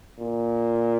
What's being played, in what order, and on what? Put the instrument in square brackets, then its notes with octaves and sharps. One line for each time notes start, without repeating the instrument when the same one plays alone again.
[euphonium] A#2